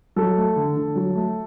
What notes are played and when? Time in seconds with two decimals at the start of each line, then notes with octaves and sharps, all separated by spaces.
0.16 F#3 A4
0.37 A3
0.56 D3
0.76 D3
0.96 F#3
1.15 A3